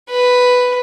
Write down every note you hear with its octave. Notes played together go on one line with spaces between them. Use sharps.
B4